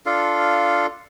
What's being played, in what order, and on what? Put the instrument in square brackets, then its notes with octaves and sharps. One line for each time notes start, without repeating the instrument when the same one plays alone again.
[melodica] D4 F4 A4 F5